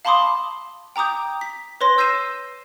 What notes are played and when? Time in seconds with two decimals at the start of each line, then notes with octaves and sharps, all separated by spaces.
0.05 F5 A5 B5 C6 D6 D#6
0.96 G5 A#5 D6 D#6 G6
1.41 B6
1.81 B4 C#5 C6 A#6
1.98 E6 G6 A#6 C7 D#7 E7